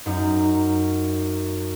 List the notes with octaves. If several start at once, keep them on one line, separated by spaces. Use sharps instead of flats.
F#2 D#4